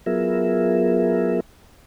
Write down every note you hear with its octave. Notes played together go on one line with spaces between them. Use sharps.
F#3 B3 F4 G#4 A#4 E5